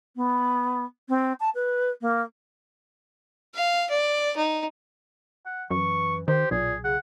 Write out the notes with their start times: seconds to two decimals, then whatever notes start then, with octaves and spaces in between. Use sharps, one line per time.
0.16 B3
1.09 C4
1.40 A5
1.55 B4
2.01 A#3
3.54 F5
3.89 D5
4.36 D#4
5.46 F#5
5.71 F#2 E3 C#6
6.28 D#3 G4 C5
6.51 B1 A#2 G#4
6.84 C#3 F#5